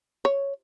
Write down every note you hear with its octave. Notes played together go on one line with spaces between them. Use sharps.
C#5